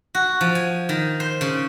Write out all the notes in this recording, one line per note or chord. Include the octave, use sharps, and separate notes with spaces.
F#4
F3
G#5
D#3
C5
C#3